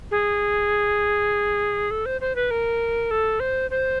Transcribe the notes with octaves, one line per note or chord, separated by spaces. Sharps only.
G#4
A4
C5
C5
B4
A#4
A4
C5
C5